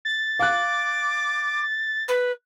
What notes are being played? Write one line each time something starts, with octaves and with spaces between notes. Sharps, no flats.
A6
F5 D6 F#6
B4